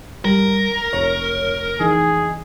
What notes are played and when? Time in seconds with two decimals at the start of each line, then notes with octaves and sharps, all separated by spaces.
0.25 G#1 G3 A#4
0.93 F1 C#5
1.80 E3 D#4 G#4